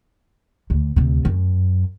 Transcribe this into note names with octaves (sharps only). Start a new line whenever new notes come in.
D2
D2 C3
F#2